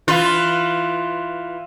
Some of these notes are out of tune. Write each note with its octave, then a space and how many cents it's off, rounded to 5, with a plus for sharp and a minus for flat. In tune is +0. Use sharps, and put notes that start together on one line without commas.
E3 +0 F4 +0 B4 +20